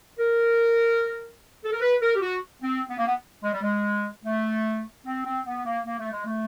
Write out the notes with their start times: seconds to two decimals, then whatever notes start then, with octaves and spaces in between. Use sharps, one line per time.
0.19 A#4
1.65 A4
1.72 A#4
1.81 B4
2.01 A#4
2.15 G4
2.21 F#4
2.62 C4
2.89 B3
2.98 A#3
3.07 B3
3.43 G#3
3.53 G3
3.62 G#3
4.25 A3
5.05 C4
5.26 C4
5.46 B3
5.65 A#3
5.86 A#3
5.99 A3
6.12 G#3
6.26 A3